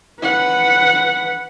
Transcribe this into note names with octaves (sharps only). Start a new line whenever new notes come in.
B4 F#5